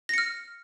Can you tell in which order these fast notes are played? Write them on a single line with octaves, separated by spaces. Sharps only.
A#6 C#7 F6